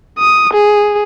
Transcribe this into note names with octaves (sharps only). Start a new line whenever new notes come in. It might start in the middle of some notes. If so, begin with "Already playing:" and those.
D#6
G#4